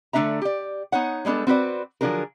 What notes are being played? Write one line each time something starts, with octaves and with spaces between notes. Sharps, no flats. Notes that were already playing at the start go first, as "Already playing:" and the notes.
D3 A3 C4 D4 E5 A#5
G4 D5
B3 D#4 C#5 F#5
G3 G#3 B3 D4 A4
C4 F#4 B4 D5
D3 F3 F#3 D4 G#4 A#4